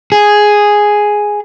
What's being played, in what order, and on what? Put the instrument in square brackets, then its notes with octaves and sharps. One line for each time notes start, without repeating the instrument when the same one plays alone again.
[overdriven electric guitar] G#4